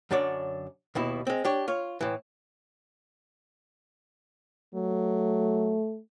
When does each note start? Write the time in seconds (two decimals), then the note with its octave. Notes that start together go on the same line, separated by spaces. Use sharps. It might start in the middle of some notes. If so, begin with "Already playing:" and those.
0.11 F#2 D3 D4 C#5 D5
0.95 D#2 B2 E4
1.27 G#3 C4
1.45 D4 G4 C#5
1.68 F4 C#5
2.01 A2 E3
4.75 F#3 A3